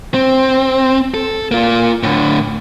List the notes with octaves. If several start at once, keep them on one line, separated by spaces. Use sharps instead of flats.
C4
A4
A#3 F4
A2 D3